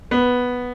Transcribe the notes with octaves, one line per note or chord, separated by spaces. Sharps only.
B3